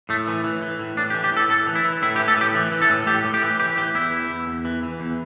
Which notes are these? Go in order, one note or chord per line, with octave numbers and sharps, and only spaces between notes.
A2 A3
E3
E3
E3
A2
A2 D4
G4
E3
G4
A2 A4
E3 A4
E3
E4
E3
A2 E4
G4
E3
A4
A2 G4
E3
E3
A4
A2
A2 G4
A2
G4
E3
E3 G4
E3 G4
E2 E4
E3
E2
E2
E3
E3
E2